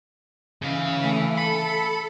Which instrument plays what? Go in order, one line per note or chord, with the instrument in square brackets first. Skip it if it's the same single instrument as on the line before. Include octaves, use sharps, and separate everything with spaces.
[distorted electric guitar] C#3 F5 [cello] E3
[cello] E3 A3
[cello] A4 [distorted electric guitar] B5